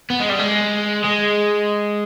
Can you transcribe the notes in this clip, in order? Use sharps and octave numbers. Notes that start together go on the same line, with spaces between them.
B3
G#3
G3
G#3
G#3